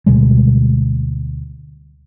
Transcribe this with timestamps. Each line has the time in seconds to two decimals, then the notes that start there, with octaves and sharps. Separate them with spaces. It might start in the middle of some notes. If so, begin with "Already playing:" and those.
0.06 D2 B2 G3 G#3